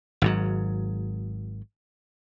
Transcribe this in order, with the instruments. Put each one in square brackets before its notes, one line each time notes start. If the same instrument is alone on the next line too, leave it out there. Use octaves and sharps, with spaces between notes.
[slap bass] G#1 G#2 F#3